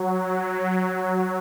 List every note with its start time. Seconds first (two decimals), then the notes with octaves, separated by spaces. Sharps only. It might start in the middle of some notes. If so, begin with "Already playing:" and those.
Already playing: F#3